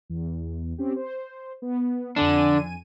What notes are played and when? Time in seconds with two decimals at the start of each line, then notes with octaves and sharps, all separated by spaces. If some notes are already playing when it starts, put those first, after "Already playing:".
0.10 E2
0.78 C4 C#4 G4
0.96 C5
1.62 B3
2.16 F2 D3 D4 G#5 D#7